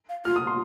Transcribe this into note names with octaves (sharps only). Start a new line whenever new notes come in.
F5
F4 F6
D#6
C6